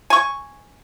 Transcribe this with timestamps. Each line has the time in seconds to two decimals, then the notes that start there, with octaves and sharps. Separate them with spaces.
0.10 G#5 C#6